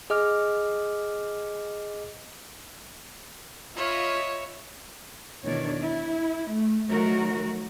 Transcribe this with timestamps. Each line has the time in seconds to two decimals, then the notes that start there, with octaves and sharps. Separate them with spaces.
0.10 G#4 D#5 D6 F6
3.76 F4 C#5 D#5 E5 B5
5.44 E2 B2 D#3 D4 C#5 D5
5.83 E4
6.50 A3
6.90 D#3 F3 F#3 A3 F#4 A#4